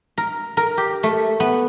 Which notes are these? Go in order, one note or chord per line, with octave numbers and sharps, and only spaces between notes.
A#4
A#4
G4
A3
B3